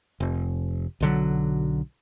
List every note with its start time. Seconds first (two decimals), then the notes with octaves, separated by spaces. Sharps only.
0.20 F1
1.00 B1 D3 F#3